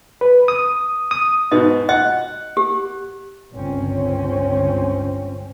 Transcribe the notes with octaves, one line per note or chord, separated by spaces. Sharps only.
B4
D#6
D#6
G#2 B2 D#5
D#5 F#5
G4
G1 C#2 C4 C#4